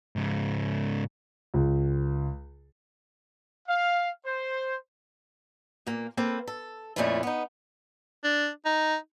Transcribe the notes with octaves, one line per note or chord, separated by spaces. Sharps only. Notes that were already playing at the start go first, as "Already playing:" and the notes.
G#2 C#3
C#2
F5
C5
A#2 A#3
A#3 C4 A4 B4
A4
F2 A#2 A3 C#4 E4 F4
B3 D#4
D4
D#4